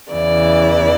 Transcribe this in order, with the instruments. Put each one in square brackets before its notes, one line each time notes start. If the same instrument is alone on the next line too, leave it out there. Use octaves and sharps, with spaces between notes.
[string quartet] E2 C#3 E3 D5